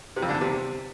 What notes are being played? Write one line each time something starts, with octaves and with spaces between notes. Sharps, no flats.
C3
F2
D3
E2
C3